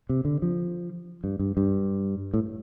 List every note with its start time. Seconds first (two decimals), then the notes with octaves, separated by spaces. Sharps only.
0.09 C3
0.25 D3
0.42 F3
1.24 G2
1.39 G2
1.57 G2
2.34 A2